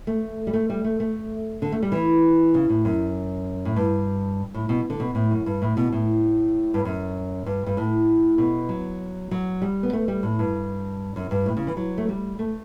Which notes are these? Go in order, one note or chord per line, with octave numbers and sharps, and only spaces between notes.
A3
G3
A3
G3
A3
A3
D3
A3
G3
E3
C#3
A2
F#2
A2
G2
A2
B2
D3
B2
A2
F#2
G2
A2
B2
A2
G2
F#2
G2
G2
A2
B2
F#3
F#3
G3
B3
A3
G3
A2
G2
F#2
G2
A2
C#3
E3
F#3
A3
G3
A3